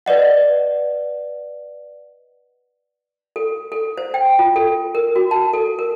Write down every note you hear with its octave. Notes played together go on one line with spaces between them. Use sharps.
B4 D5 D#5 F#5
A4
A4
C5
G5
F4
A4
A#4
F#4
A5
A4
A#4